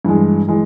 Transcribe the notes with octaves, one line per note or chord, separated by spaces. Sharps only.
G2 E3 G#3
E3 G#3